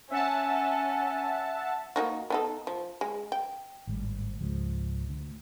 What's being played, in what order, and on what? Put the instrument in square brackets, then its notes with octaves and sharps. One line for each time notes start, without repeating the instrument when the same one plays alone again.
[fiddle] C#4 [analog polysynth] E5 F#5 A5
[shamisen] A#3 D#4 F#4
B3 D#4 A4
F3
G#3
G5
[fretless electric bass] G#1 A2 D3 G3
C#2 G#2 F3 G#3
D2